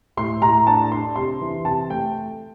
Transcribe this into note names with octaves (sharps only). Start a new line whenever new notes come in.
A2 C6
A2 A#5
D4 A5
D4 C6
C3 C6
E3
C3 A5
A3 G5